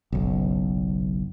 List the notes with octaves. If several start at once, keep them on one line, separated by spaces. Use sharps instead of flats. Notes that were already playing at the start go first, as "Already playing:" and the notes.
F#1 B1